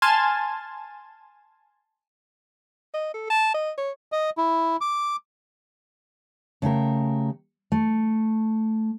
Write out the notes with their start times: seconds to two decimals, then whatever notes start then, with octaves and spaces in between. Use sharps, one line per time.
0.02 G#5 A5 C6 F6 G#6 A6
2.94 D#5
3.14 A4
3.30 A5
3.54 D#5
3.77 C#5
4.12 D#5
4.37 E4
4.81 D6
6.62 C#3 A3 G4 A#4
7.72 A3